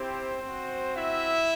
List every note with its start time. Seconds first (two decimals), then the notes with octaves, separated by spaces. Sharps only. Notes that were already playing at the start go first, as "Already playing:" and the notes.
Already playing: C4 E4 G4 C5
0.42 C4 F#4
0.95 E4 E5